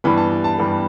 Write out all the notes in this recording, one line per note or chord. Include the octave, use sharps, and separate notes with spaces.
G2 E3 G3 B3 B5
A5
A5
A5
G2 E3 G3 B3